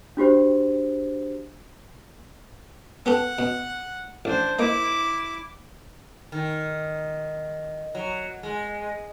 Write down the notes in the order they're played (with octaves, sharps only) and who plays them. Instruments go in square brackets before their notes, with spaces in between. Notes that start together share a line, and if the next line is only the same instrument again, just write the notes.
[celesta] D4 F#4 G4 C5
[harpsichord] B3 G4 A4 [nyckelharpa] F#5
[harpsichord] B2
[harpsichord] A1 [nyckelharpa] D4 C5
[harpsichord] A#3 D#4 [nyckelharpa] E4 D6
[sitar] D#3
F#3
G#3